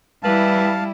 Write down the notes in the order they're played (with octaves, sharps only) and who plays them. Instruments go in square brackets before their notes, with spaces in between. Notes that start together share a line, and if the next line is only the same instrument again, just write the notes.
[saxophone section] E3 B4 [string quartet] G3 E4 [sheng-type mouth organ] F5 A5